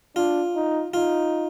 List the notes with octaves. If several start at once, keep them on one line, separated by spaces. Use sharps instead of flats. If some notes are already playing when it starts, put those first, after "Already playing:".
D4 F4
D#4
D#4 F4